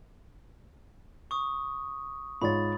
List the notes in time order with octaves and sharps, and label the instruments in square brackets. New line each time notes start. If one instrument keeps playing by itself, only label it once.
[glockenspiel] C#6 D#6
[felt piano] G#2 F4 C#5 [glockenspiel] B5 A6